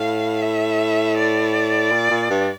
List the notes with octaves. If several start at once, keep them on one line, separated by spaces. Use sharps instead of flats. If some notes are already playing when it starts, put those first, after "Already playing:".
Already playing: A2 F5
E5
D5
A#2
A#2
G2